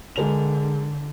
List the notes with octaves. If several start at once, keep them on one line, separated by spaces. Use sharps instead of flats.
D3 G#3 A#4 F7